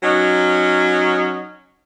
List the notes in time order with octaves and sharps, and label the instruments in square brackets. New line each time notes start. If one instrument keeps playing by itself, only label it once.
[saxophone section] F#3 C#4 D#4